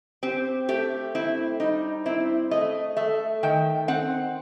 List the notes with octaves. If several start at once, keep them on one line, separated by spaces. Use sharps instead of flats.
C4 G4
A3 G4
C4 E4
G3 D#4
C4 E4
A3 D#5
A3 E5
D#3 G5
C4 F#5